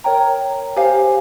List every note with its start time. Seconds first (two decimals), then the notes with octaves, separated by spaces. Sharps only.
0.04 A#4 C#5 G5 A#5
0.77 G4 C5 F5 G#5